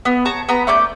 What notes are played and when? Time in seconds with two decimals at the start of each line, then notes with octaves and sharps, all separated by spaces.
0.05 B3
0.25 C#5 A5 A#5
0.49 B3 A#5 B5
0.67 A3 C#4 D5 G6